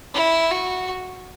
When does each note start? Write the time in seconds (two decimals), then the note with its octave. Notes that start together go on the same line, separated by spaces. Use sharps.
0.14 E4
0.51 F#4